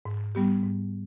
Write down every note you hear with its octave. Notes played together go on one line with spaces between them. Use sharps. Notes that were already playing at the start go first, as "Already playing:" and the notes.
G#2
G3 B3 G4
G#2